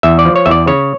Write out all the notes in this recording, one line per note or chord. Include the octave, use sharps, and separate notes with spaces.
E2 E5
D5
F3
C#5
E2 E5
D5
C#3 C#5